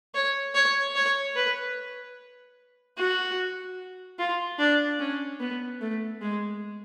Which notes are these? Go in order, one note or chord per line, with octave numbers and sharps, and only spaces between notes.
C#5
C#5
C#5
B4
F#4
F4
D4
C#4
B3
A3
G#3